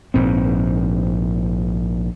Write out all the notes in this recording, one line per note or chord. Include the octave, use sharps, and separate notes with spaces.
A#1 G#2 C4